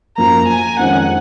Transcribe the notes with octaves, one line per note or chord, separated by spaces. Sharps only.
F#2 F3 A#3 A#5
G#5
F2 D#3 G#3 C#4 F#5